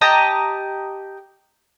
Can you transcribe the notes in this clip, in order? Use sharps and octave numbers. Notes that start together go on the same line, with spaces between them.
G4 D#5 A5 A#5